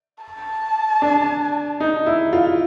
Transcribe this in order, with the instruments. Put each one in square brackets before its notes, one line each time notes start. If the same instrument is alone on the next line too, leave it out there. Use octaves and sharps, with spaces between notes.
[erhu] A5
[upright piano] D4
D#4
E4
F4